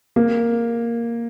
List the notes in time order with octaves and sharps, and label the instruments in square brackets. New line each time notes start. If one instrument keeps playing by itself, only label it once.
[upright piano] A#3